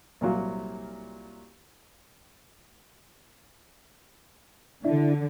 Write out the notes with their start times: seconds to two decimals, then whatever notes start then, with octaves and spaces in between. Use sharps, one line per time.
0.21 C2 A#2 F#3 F5
4.85 D3 D4 E4